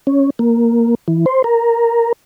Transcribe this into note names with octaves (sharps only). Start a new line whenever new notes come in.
C#4
A#3
E3
C5
A#4